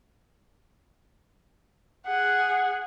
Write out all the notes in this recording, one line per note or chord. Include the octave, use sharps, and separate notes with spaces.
G#4 F#5